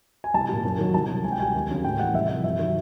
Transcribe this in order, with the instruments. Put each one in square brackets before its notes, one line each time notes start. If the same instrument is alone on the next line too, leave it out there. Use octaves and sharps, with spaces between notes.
[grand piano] G#5
C2 A5
A#2 G3
F#2
D#3 F#3
C2 A5
B2 F#3
C#2 G#5
G5
B2 G3 G#5
D#2
C#3 F#3
A2 G5
E3 G3 F#5
C2 E5
C3 F3 E5
G2 E5
D#3 F#3